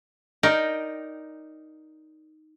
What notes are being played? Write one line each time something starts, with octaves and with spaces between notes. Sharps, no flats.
D#4 A#4 D5 G5